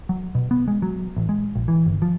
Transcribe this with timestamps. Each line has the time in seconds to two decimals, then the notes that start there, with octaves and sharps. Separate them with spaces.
0.09 F#3
0.35 B2
0.51 B3
0.68 G#3
0.82 F#3
1.16 A1
1.29 G#3
1.55 A#1
1.68 E3
1.86 G1
2.02 F3